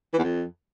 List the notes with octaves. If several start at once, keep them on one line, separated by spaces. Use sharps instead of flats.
E3
E2
F2